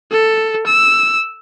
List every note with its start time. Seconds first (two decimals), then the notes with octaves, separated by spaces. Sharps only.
0.12 A4
0.66 E6